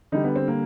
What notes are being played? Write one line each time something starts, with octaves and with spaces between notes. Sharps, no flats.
D3 G3 D#4
B3
C4
A#3